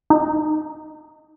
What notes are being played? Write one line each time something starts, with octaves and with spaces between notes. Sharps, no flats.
D#4